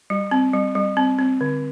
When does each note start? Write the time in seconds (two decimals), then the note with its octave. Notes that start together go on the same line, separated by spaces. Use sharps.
0.10 G3
0.31 C4
0.54 G3
0.75 G3
0.97 C4
1.19 C4
1.41 D3